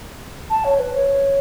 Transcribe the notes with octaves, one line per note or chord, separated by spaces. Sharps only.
A5
C#5
B4
C#5